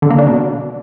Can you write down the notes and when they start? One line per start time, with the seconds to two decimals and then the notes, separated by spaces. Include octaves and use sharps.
0.02 D3
0.10 A#3
0.18 D4
0.27 B2